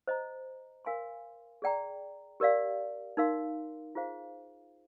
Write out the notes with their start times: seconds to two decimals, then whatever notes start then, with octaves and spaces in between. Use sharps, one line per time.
0.07 C5 D#5 A#5
0.85 A#4 F5 G#5 C6
1.62 G#4 D5 G5 A#5
2.40 G4 A#4 D5 F5
3.17 D#4 A#4 F5 C6
3.95 F4 G#4 C5 F5